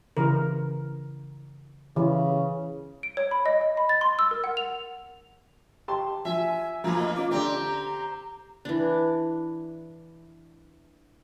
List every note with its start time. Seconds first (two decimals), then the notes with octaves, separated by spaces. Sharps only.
0.17 C#3 E3 A#4
1.96 C#3 E3
3.03 D7
3.17 C#5
3.31 B5
3.46 D#5
3.61 D#5
3.77 B5
3.89 A6
4.01 C6
4.19 E6
4.31 A#4
4.44 F#5
4.57 F7
5.88 G4 A5 C6
6.25 F3 E5 G#5
6.84 F3 A3 A#3 A#5
6.99 D#5
7.16 C#4 F4 D6
7.31 D3 C4 G4 D5 A#5
8.65 E3 D4